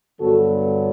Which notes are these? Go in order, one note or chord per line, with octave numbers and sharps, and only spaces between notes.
G2 D3 F#3 B3 F#4 A4